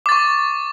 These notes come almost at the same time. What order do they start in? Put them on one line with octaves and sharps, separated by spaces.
D6 A6 C#6